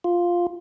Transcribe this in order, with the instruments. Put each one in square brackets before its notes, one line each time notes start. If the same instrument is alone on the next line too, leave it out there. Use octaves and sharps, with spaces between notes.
[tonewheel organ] F4